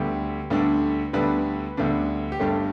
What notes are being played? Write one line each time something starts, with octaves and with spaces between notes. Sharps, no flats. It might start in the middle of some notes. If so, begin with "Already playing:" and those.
Already playing: D2 D3 G3 B3 D4 G4
D2 D3 G3 B3 D4
D2 D3 G3 B3 D4 B4
D2 D3 G3 B3 D4
G4
G1 G2 G3 A3 D4 A4